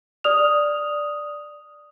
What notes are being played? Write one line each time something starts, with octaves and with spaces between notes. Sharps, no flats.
D5 D#6 F6 F7